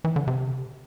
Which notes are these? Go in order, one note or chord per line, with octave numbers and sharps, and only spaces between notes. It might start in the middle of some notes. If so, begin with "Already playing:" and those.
E3
D3
C3